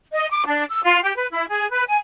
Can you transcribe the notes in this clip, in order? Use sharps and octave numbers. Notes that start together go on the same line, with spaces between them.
D#5
D6
D4
E6
F4
G4
B4
E4
G#4
B4
G#5